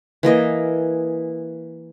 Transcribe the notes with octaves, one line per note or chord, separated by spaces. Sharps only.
E3 A#3 D#5 G#5